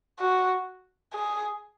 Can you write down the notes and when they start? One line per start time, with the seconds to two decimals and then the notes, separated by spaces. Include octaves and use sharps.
0.19 F#4
1.13 G#4